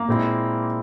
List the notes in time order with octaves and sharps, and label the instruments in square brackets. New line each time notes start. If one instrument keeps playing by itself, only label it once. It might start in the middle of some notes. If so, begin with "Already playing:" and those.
Already playing: [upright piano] A#3
[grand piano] A#2 G#3 C4 E4